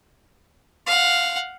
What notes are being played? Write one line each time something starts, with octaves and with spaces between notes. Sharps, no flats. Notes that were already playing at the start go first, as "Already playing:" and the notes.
F5 F#5